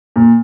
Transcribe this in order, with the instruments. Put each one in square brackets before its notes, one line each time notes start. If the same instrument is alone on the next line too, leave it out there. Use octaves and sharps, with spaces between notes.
[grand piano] A#2